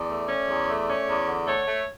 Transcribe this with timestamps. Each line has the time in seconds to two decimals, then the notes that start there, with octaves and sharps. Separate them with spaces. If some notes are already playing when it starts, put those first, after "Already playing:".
Already playing: E2 D5
0.08 A3
0.28 C#4
0.48 E2
0.69 A3
0.88 C#4
1.08 E2
1.27 D3
1.47 A3 C#5
1.67 A3